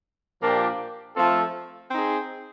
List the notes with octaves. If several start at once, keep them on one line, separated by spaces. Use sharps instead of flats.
A#2 F3 A#3 D4 G4
F3 A3 C4 F4 A4
C4 D#4 G#4